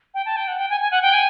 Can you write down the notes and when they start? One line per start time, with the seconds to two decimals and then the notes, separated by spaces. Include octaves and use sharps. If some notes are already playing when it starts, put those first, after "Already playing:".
0.14 G5
0.26 A5
0.37 G5
0.48 F#5
0.58 G5
0.70 G#5
0.81 G#5
0.91 F#5
1.02 G5
1.13 G#5